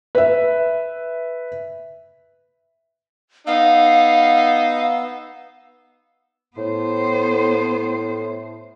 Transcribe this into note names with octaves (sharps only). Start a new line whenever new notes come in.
B4 E5
B3 D#4 F5 E6
A2 B3 C5